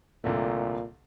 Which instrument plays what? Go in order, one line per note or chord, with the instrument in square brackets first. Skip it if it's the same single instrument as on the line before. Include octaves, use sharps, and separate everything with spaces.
[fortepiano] C2 D3 A3 [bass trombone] A#2